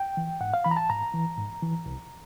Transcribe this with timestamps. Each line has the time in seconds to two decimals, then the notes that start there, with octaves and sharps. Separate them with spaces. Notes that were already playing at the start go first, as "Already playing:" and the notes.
Already playing: G5
0.17 E3
0.41 G#2 F#5
0.54 F5
0.64 E3 B5
0.71 A#5
0.77 A5
0.90 G#2 A#5
1.14 E3
1.37 G#2
1.63 E3
1.86 C2